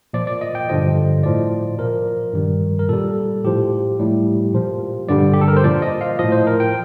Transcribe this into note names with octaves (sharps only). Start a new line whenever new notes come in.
A#2 F3 D5
D5
D#5
G5
G2 D3 F3 D#5
A2 F3 D5
A#2 F3 A#4
G2 D#3 G3
A#4
A#2 G3 A4
A2 F3 G4
A2 G3
A#2 F3
G2 D3 G3 D5
G4
A4
A#4
C5
A#2 F3 D5
D#5
F5
A2 F3 D#5
C5
A#4
G5